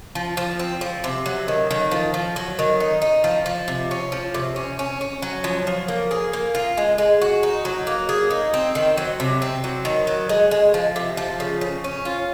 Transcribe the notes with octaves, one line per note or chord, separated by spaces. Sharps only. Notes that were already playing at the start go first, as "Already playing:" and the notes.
F3
F3
C4
F3
C3
F#3
D#3
D#3
F3
F3
F#3
D#3
D#4
D#4
F3
F3
C3
C#4
F3
C3
C#4
C#4
C#4
F#3
F3
F3
A#3
G#4
A#3
F4
G#3
G#3
F#4
D#4
F#3
A#3
G#4
D#4
C4
D#3
F#3
C3
C4
F#3
D#3
F#3
G#3
G#3
F3
C3
F3
C#3
C#3
C#4
F4